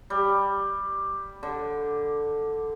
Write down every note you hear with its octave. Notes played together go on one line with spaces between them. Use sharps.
G3
D3